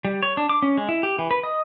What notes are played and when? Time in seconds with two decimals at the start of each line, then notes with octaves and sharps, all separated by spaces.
0.05 G3
0.23 C#5
0.37 D4
0.49 D6
0.62 C#4
0.77 G#3
0.89 E4
1.03 G4
1.19 E3
1.31 B4
1.43 D#5